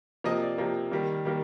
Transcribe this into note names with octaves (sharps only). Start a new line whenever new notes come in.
C3 F3 A#3 D#5
D5
C3 F3 A#3
D#3 G3 A#3
D#3 G3 A#3